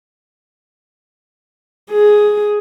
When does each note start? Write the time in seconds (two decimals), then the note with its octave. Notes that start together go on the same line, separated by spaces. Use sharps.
1.91 G#4